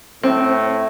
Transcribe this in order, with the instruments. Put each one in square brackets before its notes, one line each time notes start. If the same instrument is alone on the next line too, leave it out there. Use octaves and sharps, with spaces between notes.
[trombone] A2 [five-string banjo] C4